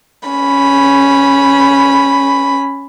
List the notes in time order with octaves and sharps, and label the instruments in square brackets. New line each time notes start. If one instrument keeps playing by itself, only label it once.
[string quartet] C#4 B5